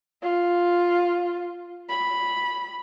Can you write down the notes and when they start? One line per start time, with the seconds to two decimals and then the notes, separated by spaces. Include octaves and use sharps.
0.22 F4
1.89 B5